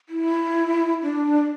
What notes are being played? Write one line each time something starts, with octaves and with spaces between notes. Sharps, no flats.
E4
D4